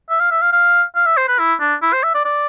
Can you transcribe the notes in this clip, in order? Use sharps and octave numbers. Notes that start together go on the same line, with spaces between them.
E5
F5
E5
F5
F5
F5
E5
C5
B4
E4
D4
E4
C5
E5
D5
D5